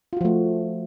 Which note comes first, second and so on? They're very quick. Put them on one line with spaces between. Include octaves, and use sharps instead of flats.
F4 F#4 F3 A3